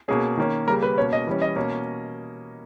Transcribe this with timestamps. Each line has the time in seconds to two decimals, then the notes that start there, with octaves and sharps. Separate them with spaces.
0.08 B2 A#3 C#4 G#4
0.37 D#3 A#3 C#4
0.67 C#3 G3 A#3 A#4
0.83 B4
0.98 B2 A#3 C#4 C#5
1.13 D#5
1.27 E3 G3 C#4
1.42 D#5
1.56 B2 A#3 C#4